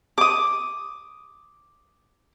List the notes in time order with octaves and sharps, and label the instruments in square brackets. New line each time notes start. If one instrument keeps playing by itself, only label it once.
[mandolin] D6 D#6